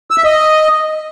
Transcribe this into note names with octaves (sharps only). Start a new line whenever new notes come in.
E6
E5
D#5